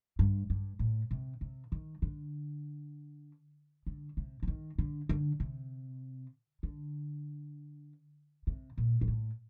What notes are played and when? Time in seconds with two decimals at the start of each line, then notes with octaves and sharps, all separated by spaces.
0.19 G2
0.50 G2
0.79 A2
1.11 C3
1.41 C3
1.72 D#3
2.02 D3
3.86 D3
4.17 C3
4.42 D3
4.48 D#3
4.78 D3
5.09 D3
5.40 C3
6.63 D3
8.47 C3
8.77 A#2
9.01 G2
9.08 A2